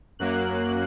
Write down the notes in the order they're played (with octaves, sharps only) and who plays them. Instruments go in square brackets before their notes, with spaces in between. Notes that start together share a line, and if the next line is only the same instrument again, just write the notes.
[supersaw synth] F#2 F#3 A#3 F#6